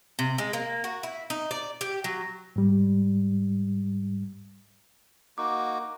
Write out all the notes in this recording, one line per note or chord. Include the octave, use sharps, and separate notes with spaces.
C3
G#3
A#3
F#4
E4
D#4
D5
G4
F#3
G#2 G3
A#3 D#4 F#4 D6